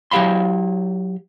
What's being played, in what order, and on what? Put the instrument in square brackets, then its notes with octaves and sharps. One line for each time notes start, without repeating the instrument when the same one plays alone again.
[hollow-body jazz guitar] F#3 E4 G4 F5 B5 C6